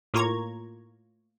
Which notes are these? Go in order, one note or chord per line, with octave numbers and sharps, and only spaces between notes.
A2 A#3 F4 C#5 A#5 G#6